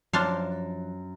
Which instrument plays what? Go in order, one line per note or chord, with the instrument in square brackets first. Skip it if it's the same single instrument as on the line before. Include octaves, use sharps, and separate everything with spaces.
[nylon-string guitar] F#2 [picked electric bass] F3 [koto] D4 C5 F5